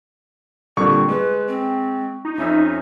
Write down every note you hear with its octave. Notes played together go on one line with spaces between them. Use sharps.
A#2 D3 G3 C4 C#6
G#3 B4
C4
D#4
F2 C#4 E5 E6